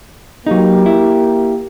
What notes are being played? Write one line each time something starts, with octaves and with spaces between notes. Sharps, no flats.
F#3 A#3 D#4 G4
E4